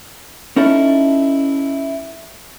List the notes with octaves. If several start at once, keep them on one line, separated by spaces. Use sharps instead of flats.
C#4 D#4 E4 A4